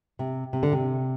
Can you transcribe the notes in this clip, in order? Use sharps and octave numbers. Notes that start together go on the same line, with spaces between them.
C3
C3
D3
C3